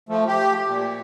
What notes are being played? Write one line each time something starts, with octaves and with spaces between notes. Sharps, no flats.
F3 A3
G4
A#2